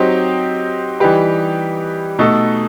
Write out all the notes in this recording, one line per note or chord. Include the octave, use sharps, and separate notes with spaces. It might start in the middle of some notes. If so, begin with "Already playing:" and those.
Already playing: F#3 C4 D#4 G4
E3 G3 D#4 G4 B4
B2 A3 D#4 A4